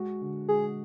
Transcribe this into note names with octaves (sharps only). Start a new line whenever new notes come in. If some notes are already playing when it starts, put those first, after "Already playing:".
Already playing: G#3 F#4
D3
G#3 G#4